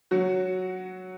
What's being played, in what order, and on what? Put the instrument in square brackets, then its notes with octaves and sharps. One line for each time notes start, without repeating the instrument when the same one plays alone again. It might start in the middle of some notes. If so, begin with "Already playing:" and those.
[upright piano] F#3 F#4